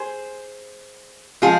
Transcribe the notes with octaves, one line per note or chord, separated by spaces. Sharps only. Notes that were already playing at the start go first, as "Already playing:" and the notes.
Already playing: G#4 C5
F3 G#3 F4 G#4